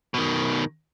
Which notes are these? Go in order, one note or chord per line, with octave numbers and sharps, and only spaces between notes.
B2 D#3